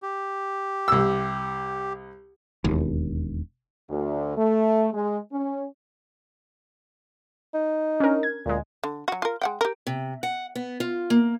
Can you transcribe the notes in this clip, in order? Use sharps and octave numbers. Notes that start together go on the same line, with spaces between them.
G4
C2 E6
E1 D#2
D2
A3
G#3
C#4
D#4
C#4 D4 A#4
G#6
D2 A#2 G#3
D3
F#3 F#4
F4 A#4
G#3 F#5 G5
G4 A#4
C3
F#5
B3
F4
A#3